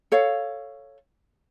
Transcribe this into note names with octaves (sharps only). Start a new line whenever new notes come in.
A4 C#5 F5